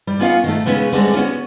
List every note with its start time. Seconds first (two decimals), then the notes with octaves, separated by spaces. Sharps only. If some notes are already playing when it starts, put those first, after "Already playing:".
0.07 G3
0.20 B3 C#4 F4 A#4 D#5 F5
0.44 D#3 A3
0.66 C#3 G#3 B3 C#4 B4
0.92 D3 G3 G#3 C4
1.13 B3 C#4 F4 F#4